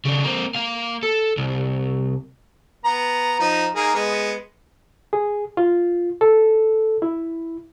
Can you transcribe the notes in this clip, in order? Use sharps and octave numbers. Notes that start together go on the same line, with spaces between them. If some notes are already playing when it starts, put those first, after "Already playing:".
C#3 D4
A#3 C4
A#3 F5
A4
C2
B3 A#5
F3 D#4
A#3 D#4 G#4
G#3 B3
G#4
F4
A4
E4